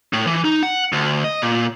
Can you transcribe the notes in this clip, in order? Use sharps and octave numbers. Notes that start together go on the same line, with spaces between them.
A2
E3
D#4
F#5
D2
D#5
A#2